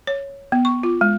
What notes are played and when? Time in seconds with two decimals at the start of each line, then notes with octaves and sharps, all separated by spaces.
0.07 C#5
0.52 B3
0.65 C#6
0.83 F4
1.01 G#3